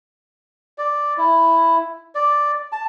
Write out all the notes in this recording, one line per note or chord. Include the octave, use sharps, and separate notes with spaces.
D5
E4
D5
A5